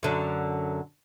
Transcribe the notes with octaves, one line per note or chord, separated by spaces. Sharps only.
F#2 D3 F#3